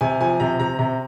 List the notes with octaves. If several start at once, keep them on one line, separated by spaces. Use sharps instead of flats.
C3 G#5
F3 G#5
C3 A#5
C3 A#5
C3 A#5